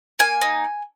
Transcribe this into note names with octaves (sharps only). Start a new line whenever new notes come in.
A#3 G#5
D#4